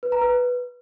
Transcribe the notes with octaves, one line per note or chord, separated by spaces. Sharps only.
B4
A#5
B4